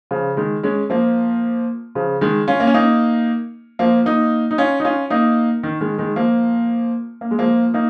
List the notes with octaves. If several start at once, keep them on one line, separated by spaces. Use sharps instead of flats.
C#3 F3
D#3 G#3
G#3 C#4
F3 A#3
C#3 F3
D#3 G#3
C#4 F4
A#3
C#4
A#3 D#4
F3 A#3
A#3 D#4
D#4
C#4 F4
D#4
C#4 F4
A#3 D#4
D#3
D#3 G#3
D#3 G#3
F3 A#3
A#3
G#3
F3 A#3
A#3 D#4